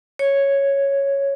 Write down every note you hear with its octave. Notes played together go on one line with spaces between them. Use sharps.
C#5